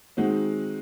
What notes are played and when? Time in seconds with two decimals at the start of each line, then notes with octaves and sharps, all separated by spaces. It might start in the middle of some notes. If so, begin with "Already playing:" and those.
0.17 D#3 G#3 C4 D#4 F#4